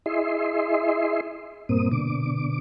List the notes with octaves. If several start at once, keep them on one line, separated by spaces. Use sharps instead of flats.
E4 G#4 D#5 E5 C6
G2 A#2 A#3 C4 D#6
B2 D3 D6